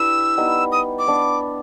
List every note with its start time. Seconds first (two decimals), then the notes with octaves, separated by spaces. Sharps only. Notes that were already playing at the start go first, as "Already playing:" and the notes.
Already playing: D4 E4 G4 B4 E6
0.37 G3 B3 D#4
0.72 D#6
0.99 D6
1.07 B3 D4